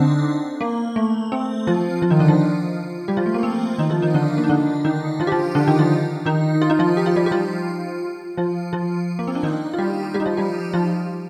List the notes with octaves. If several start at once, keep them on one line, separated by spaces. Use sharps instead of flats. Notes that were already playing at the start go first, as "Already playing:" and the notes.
Already playing: D3 C4 D4 D#4
A#3
A3
C4
F3 F4
F3 F4
D#3 D#4
D3 D4
F3 F4
G3 G4
F3 F4
A3
A#3
C4
D#3 D#4
F3 F4
D#3 D#4
D3 D4
A#3
D#4
D3 D4
D#3 D#4
F3 F4
G4
F3 F4
D3 D4
D#3 D#4
F3 F4
D#3 D#4
F4
D#4
F3 F4
G4
F4
G3 G4
G4
F3 F4
F3 F4
F3 F4
A#3
C4
D4
D#3 D#4
F4
G3 G4
G3 G4
D#4
F3 F4
G3 G4
F3 F4